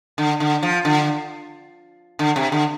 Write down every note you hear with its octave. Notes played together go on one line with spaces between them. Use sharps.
D3
D3
F3
D3
D3
C3
D3